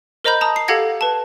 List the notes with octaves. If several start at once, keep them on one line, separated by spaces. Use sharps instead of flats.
A#4 C5 D#5 A#5 B5 G6
A5 A#5 D#6
C7
G4 A4 F5 F#5 G#6 A#6
B4 A5